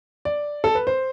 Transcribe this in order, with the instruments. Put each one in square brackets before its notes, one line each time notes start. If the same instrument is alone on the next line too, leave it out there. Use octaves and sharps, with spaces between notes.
[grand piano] D5
A4
B4
C5